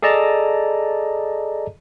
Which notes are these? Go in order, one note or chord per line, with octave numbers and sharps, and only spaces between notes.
G#4 A4 D5 D#5 A5 A#5